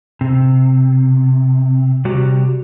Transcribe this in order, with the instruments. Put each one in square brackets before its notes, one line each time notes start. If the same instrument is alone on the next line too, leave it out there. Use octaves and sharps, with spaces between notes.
[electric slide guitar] C3
C3 G3 F#4 G4